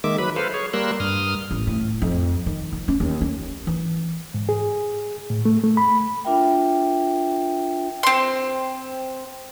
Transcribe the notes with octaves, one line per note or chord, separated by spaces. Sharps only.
D#3 G#3 A#3 E5 D6
F#3 B4 B5
A4 B4 C5 F5
G#4 C#5
G3 A#3 A#4 C6 E6 F#6
G2 D#6 F6
A1
A2
F2
D#3
F3
C#4
D#2
C#4
E3
G#2
G#4
A2
A3
A3
B5
D4 F4 A#4 E5 G5
C4 C6